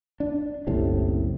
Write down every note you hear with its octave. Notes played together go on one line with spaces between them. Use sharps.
D4
F#1 C2 A2 C3